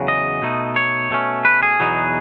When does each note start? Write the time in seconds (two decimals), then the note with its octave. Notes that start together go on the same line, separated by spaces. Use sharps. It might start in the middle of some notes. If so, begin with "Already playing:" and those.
Already playing: E2 C#3 F#3
0.08 D#5
0.42 B2 A3 D#4
0.76 C#5
1.11 B2 A3 C#4
1.45 B4
1.63 G#4
1.80 E2 B2 F#3 B3 D#4